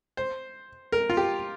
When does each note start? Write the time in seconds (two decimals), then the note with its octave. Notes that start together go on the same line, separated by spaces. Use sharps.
0.17 C5
0.92 A#4
1.10 F4
1.17 G4